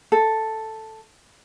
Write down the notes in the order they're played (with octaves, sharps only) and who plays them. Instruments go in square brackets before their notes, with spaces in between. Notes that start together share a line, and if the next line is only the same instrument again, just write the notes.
[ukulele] A4